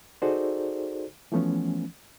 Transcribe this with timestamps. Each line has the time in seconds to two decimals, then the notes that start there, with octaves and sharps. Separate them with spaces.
0.22 D#4 F#4 G#4 A4 C5 D5
1.32 E3 F3 A3 B3 C#4